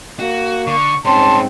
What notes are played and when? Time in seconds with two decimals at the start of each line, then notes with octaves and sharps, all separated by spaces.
0.20 A#3 F#4
0.67 D3 C#6
1.05 G#2 G3 C4 C#4 A5 C6